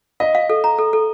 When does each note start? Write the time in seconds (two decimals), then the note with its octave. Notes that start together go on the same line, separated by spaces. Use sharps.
0.20 D#5 F5
0.35 F5
0.50 A4
0.64 A#5
0.78 A4
0.93 A4